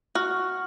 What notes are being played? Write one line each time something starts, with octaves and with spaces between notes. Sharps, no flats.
F#4 C#6 F6